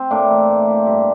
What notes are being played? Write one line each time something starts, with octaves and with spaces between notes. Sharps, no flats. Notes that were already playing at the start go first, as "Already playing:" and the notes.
Already playing: C4
A2 A#3 D4
E3
A2
E3
G2